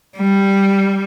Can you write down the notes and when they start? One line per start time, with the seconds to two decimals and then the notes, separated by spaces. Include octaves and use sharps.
0.17 G3